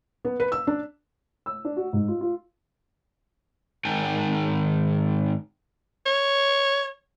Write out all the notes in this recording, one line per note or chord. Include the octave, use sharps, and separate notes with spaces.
B3
B4
E6
D4
E6
D4
F#4
G#2
F4
F4
G#2 D#3 G5 G#5
C#5